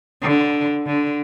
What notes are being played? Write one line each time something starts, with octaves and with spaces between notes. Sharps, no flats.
D3
D3